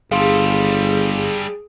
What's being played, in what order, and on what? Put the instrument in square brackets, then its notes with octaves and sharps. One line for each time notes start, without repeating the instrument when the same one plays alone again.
[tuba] G1 [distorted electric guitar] G3 A4 [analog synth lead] G#4 [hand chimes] F5 C6